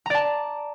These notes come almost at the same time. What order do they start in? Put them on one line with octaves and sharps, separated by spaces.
A#5 D5 A5